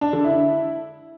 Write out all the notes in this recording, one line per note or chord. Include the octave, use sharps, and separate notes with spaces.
D4
D3
E4